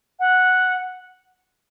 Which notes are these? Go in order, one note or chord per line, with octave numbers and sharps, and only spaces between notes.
F#5